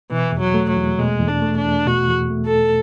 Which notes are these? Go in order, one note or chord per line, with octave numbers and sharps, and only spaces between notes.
B2 E3
E2
F#3
A3
F#3
E2
B2 G#3
E2
D4
A3
D4
E2
B2 F#4
E2
A3
A4
E2